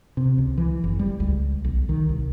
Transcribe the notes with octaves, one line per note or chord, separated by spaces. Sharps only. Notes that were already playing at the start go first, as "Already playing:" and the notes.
C3
C#2
E3
F#1
G3
C#2
B1
D#3
C2